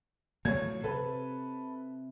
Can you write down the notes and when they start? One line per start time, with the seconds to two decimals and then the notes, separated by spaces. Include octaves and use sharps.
0.45 A2 F3 F#3 C#5 G#6
0.84 C3 A4 B4